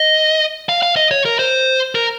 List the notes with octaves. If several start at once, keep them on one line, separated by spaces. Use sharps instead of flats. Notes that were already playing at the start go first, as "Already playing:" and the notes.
Already playing: D#5
F5
F5
D#5
C#5
A#4
C5
A#4